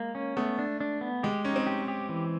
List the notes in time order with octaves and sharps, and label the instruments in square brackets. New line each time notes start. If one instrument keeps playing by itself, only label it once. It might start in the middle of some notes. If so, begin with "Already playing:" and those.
Already playing: [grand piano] G#3 [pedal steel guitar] A#3
[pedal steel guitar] C#4
[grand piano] A3 [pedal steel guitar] B3
[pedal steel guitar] D4
D4
B3
[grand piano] G#3 [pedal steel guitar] G4
[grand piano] C#4 [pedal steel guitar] D#4
[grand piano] C4
[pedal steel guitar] G4
G4
E3